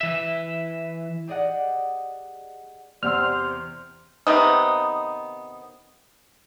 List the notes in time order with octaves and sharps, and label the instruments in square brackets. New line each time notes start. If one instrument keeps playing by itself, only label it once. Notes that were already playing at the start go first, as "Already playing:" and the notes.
[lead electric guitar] E3 E5
[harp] G4 G#4 D5 D#5 F#5
[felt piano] E2 C3 [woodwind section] G4 C5 [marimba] D5 F#5 E6 [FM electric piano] F6
[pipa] C3 D#3 B3 D#4